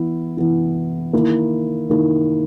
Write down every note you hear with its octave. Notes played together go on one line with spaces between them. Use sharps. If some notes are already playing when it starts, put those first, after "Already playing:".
Already playing: E3 B3 E4
E3 B3 E4
D#3 A#3 E4
D#3 A#3 E4